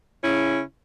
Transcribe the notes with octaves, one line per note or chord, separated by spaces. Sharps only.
C#3 C#4 E4